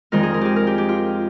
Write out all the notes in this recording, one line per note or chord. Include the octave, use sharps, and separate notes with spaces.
F2 D#3 G#3 C4 A#4
G#4
A#4
G4 G#4
A#4
G4
G4
F4